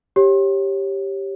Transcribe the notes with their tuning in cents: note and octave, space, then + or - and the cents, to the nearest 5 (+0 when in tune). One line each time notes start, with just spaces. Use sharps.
G4 +0 C#5 -20